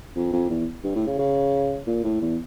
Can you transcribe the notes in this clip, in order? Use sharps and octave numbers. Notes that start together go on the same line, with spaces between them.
F2
F2
E2
G2
A2
C#3
C#3
A#2
A2
E2